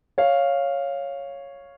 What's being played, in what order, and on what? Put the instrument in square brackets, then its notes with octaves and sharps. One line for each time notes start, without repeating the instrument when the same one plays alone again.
[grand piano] C#5 F5